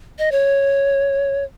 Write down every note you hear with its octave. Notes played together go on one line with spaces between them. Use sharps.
D#5
C#5